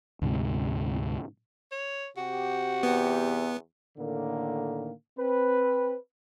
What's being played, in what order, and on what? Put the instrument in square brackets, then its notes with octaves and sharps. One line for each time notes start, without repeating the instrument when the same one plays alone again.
[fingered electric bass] D2 G#2 C3 G#3
[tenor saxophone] C#5
[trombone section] C3 C4 G4 [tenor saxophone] F#4
[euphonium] E2 [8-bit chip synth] B3
[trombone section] A2 D3 D#3 A#3
C4 B4